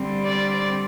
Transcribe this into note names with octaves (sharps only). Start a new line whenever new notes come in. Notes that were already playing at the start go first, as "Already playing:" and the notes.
Already playing: D3 G3 C4
D5